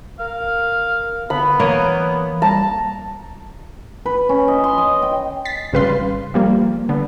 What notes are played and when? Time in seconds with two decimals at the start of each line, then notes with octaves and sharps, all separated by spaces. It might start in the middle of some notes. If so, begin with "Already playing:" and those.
0.19 A#4 F5
1.30 D3 B3 B5
1.60 E3 A#3 C#5 D#5
2.42 G3 A5 A#5
4.06 B4
4.29 C#4
4.48 D#5
4.64 C6
4.78 D#5
5.02 G5
5.45 A6 B6 C7
5.73 G#1 C#3 G3 B4 F5 C6
6.34 F3 G3 A#3
6.89 D3 B3